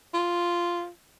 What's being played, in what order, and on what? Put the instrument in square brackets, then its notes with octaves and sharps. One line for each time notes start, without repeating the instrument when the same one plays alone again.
[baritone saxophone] F4